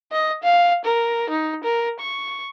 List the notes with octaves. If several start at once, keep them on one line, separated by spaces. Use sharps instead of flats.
D#5
F5
A#4
D#4
A#4
C#6